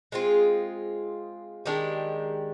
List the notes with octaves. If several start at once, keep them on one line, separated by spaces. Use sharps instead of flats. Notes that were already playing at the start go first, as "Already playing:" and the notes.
G#3 C4 F4 G#4
D#3 G#3 D4 G4